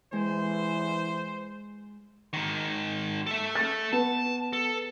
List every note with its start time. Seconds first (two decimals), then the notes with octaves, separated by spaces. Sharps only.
0.13 E3 G#3 C5
2.33 G#2 D#3
3.27 A4 E5
3.55 A6
3.93 B3 A5
4.53 A4